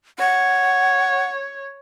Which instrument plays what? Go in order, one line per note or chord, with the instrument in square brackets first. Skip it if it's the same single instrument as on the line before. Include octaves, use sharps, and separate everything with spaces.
[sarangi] C#5 [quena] F#5